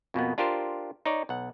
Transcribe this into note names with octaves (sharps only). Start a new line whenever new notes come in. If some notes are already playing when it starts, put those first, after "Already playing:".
F2 B2 A#3 B3
D4 F4 G4 A#4 C5
D#4 C#5 D5
B1 F#5